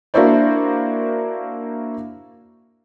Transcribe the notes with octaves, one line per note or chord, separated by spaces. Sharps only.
A#3 D4 E4 F#4 C5 D5